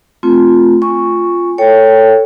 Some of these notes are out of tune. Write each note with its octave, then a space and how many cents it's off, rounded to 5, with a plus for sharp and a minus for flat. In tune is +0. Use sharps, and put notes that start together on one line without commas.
A3 +0 C4 +0 F4 +0
F4 +0 G#5 -20 C#6 +0
A4 +15 C#5 +5 G5 +0